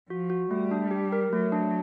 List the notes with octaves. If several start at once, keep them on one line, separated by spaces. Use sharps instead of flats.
F3 F#4
F#4
G3 A3
D4
G4
A#4
F#3 A3
D4